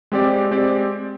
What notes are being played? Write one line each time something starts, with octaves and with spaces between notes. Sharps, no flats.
G#3 C4 G4 D5
G#3 C4 G4 D5